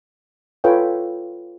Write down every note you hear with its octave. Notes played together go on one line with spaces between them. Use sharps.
F4 A4 B4 C#5 F5 G5